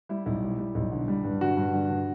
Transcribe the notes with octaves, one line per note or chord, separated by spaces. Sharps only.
G3 E4
B1 E4
G3
G3
B1
D3
G3
G2
D3 F#4
G2
D3
D3